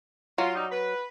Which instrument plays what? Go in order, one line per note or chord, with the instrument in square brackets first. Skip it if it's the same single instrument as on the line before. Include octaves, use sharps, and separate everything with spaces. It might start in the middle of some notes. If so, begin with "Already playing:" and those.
[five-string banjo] F#3 [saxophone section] F4
[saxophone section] G3 D#4
B4